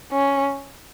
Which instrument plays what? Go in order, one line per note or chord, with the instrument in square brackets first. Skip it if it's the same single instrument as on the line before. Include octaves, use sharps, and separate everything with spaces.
[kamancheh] C#4